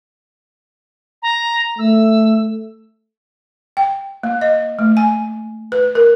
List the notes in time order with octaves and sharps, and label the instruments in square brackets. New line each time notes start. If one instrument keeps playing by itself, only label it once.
[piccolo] A#5
[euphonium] A3 [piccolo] E6
[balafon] G5
A#3
D#5
A3
G#5
B4
A#4